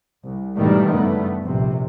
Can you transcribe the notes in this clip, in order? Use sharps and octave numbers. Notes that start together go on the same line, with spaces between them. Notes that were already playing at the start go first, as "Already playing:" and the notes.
C2
G#2 B2 D#3 E3 G3 A3
F#1 G2 A3 B3
A#1 C3